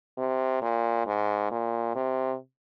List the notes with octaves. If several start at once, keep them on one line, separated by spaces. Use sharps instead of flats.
C3
A#2
G#2
A#2
C3